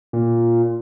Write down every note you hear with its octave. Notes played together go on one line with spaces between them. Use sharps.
A#2